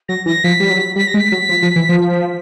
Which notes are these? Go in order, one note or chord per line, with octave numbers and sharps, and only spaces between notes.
F#3 A#6
E3 A#6
F3 B6
G3
F#3
G3 B6
A#6
G#3
B6
F#3
F3
F3
E3
F3